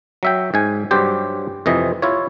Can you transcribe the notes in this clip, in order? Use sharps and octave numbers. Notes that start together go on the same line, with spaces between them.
F#3 E5 G5
G#2 G#5
G2 F#3 G4 C5
F2 C3 E3 D#5
E4 F4 C#5